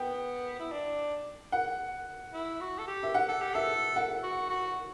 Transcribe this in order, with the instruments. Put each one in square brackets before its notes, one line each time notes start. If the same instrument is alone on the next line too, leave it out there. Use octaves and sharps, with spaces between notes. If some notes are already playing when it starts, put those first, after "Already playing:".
Already playing: [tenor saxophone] B3 [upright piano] G5
[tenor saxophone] E4
D4
[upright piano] F#5
[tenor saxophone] E4
F#4
A4
G4
[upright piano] E5
F#5
[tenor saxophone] A4
G4
[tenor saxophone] A4 [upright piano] E5
[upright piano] F#5
[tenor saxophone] F#4
F#4